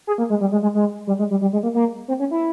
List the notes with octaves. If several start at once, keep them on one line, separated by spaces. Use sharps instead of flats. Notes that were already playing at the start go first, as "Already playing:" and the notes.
G#4
A#3
G#3
G3
G#3
G#3
G#3
G3
G#3
G3
G3
G#3
A#3
A#3
C4
C#4
E4